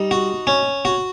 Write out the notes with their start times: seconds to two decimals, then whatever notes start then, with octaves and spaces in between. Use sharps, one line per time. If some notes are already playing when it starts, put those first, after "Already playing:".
Already playing: G3 D#4
0.11 F#4
0.47 C#4
0.85 F#4